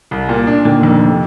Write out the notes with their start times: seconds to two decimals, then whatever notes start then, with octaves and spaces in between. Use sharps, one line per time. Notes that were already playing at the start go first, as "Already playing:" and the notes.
0.11 C2
0.29 A#2
0.47 D4
0.65 A#2 D3 D#3
0.83 F2
1.02 C3